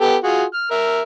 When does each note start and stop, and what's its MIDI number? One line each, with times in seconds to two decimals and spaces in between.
0.01 0.16 59
0.01 0.16 67
0.01 0.16 69
0.24 0.44 65
0.24 0.44 66
0.24 0.44 68
0.54 0.70 89
0.71 1.02 70
0.71 1.02 76